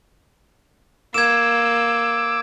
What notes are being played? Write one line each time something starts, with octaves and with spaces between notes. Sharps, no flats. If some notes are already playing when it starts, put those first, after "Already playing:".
A#3 D6 E6 G#6 E7